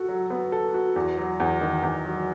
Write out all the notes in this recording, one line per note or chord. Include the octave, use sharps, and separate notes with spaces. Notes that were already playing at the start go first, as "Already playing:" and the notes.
Already playing: F#4 A4
F#3
B3
A4
F#4
E2
F#3
E2
D#3
E2
F#3